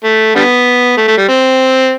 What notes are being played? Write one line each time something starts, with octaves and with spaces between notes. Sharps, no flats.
A3
D3 G3 B3
A3
A3
G3
C4